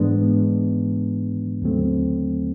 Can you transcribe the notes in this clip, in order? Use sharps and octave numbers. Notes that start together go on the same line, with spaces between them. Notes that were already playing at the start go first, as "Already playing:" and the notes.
Already playing: G#2 E3 G#3 B3 D4
D#2 D3 F#3 A3 C4